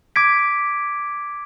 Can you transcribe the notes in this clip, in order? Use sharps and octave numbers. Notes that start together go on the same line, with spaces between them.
D6 G#6 B6 D7